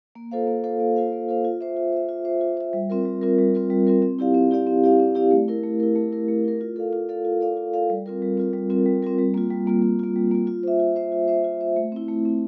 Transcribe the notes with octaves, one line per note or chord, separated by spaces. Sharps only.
A#3
F4 A4 C5 F5
A#3
F4 A4 C5 F5
A#3
F4 A4 C5 F5
A#3
F4 A4 C5 F5
F4
C5 E5
F4
C5 E5
F4
C5 E5
F4
C5 E5
G3
C4 F4 A#4
G3
C4 F4 A#4
G3
C4 F4 A#4
G3
C4 F4 A#4
C4
E4 G4 D5 F5
C4
E4 G4 D5 F5
C4
E4 G4 D5 F5
C4
E4 G4 D5 F5
A3
E4 A#4
A3
E4 A#4
A3
E4 A#4
A3
E4 A#4
F4
A4 D5 F5
F4
A4 D5 F5
F4
A4 D5 F5
F4
A4 D5 F5
G3
C4 F4 A#4
G3
C4 F4 A#4
G3
C4 F4 A#4
G3
C4 F4 A#4
G3
A#3 F4
G3
A#3 F4
G3
A#3 F4
G3
A#3 F4
F4
C5 E5
F4
C5 E5
F4
C5 E5
F4
C5 E5
A3
C4 E4
A3
C4 E4